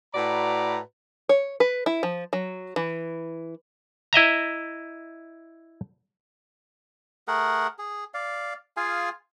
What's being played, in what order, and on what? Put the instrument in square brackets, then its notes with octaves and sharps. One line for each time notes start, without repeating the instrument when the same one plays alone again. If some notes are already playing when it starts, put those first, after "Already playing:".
[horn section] A2 F#4 B4 D5 A#5
[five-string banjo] C#5
B4
E4
F3
F#3
E3
[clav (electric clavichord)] E4 D#5 E5 A#5
[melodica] A3 G#4 A#4 F#5
G#4
D5 F5
F4 G#4 F5 G#5